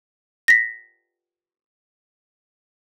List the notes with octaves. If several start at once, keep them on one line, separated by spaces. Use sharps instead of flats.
A#6 B6